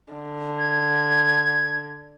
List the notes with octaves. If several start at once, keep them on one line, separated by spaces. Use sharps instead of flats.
D3
G#6